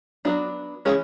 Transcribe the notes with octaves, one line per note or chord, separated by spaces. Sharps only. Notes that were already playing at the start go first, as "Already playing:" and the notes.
F#3 B3 D4 F#4
E3 G#3 C#4 G#4